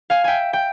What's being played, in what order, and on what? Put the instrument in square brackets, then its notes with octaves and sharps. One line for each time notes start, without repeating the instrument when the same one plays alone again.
[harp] F5 G#5
E5 G5 G#5
G5